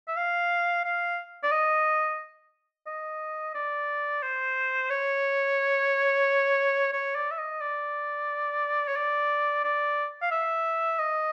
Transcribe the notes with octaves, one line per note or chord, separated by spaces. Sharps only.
E5
F5
F5
D5
D#5
D#5
D5
C5
C#5
C#5
D5
E5
D#5
D5
C#5
D5
D5
F5
E5
D#5